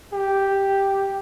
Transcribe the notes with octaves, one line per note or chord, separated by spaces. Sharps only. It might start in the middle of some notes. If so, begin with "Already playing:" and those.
G4